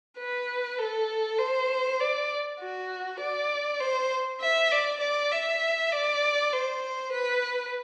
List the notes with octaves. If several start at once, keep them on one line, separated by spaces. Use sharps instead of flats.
B4
A4
C5
D5
F#4
D5
C5
E5
D5
D5
E5
D5
C5
B4